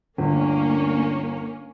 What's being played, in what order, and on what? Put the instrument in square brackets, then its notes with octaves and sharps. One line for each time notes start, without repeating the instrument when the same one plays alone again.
[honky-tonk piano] G1 [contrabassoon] D2 [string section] A#3 C#4